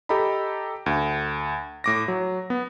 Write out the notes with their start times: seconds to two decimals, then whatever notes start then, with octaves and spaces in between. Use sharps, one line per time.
0.09 G4 A4 D#5 A#5 B5
0.86 D2
1.84 A2 D6 A#6
2.08 F#3
2.50 B3